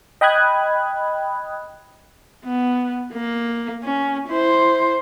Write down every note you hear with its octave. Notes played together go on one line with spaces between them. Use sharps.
D#5 G5 B5 D#6 F#6 G#6
B3
A#3
C#4
E4 C5